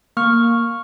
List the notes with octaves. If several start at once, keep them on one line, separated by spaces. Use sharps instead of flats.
A#3 C#6 F6